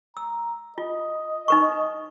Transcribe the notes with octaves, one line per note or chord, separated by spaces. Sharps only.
A#5 E6
F4 D#5
D#4 B4 C#6